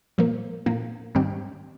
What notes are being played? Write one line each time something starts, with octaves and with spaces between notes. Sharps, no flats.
A#2 F3 A#3
A#2 F3 A#3
G#2 D#3 G3 C4 G4